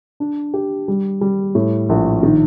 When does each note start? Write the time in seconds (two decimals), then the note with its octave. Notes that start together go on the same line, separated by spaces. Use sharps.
0.20 D4
0.54 G4
0.88 G3
1.21 G3
1.55 A2
1.89 A#1
2.23 D#3